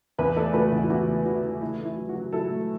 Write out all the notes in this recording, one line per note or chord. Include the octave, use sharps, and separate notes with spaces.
E2 B4 E5
A3 A4 D5
A3 F#4 B4
E2 F#4
E4
E2 F#4
A3
E3 F#4
E3
A3 E4
A3
E4
F#3
F#4
F#3
F#3 E4 A4
A3